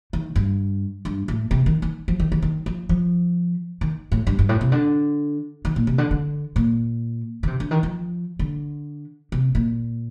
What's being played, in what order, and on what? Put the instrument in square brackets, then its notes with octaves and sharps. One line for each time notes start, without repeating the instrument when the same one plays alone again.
[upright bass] D#3
G2
G2
A2
C3
D#3
D#3
F3
D#3
D#3
D#3
F3
F3
D#3
A2
G2
G2
A2
C3
D3
D#3
A#2
C3
D3
D3
A#2
D3
C3
D3
D#3
F3
D3
C3
A#2